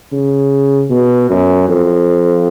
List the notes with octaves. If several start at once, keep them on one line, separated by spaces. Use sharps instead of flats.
C#3
B2
F#2
F2